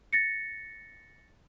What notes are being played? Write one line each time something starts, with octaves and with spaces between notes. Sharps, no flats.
A6 A#6 C#7